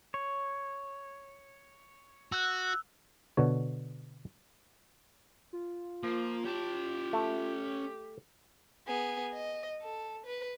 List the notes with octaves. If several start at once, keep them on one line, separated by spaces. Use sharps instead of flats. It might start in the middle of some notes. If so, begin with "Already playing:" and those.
C#5
F#4 E6 F#6
B2 D3 C#5
F4
F3 A#3
C#4 G4 A5
A3
B3 G#4
D#5
A4
B4